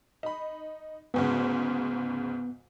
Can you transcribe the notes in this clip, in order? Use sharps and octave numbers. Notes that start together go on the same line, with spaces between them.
D#4 B5
D2 G#2 C#3 B3